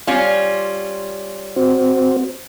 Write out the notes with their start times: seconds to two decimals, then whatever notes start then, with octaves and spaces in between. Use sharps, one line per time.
0.07 G3 C#4 F4
1.56 C4 F#4 C5